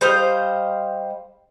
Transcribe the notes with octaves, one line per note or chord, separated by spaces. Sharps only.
G3 C5 D#5 F5